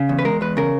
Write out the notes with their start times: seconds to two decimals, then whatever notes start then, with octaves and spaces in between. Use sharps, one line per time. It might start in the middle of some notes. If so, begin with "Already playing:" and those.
Already playing: C#3
0.09 E2
0.19 B4
0.25 G#3 A#4
0.41 E2 B4
0.57 C#3 A#4